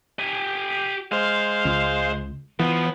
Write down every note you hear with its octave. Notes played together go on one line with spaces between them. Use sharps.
G4 G#5
G#3 C5 F5
C#2
E3 F3 B3